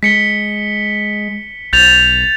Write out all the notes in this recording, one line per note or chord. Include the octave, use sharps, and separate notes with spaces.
G#3 B6 C#7 G7
B1 G6 A6 F7